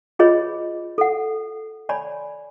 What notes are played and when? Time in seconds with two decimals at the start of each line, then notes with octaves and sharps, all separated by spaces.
0.19 F4 G#4 B4 C#5 D#5 B5
0.98 A4 F#5
1.89 C#5 D5 G#5 B5